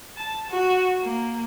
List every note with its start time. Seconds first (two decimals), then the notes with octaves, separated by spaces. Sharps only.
0.17 A5
0.50 F#4
1.03 A#3